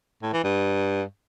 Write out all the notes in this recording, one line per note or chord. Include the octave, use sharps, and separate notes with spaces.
A2
E3
G2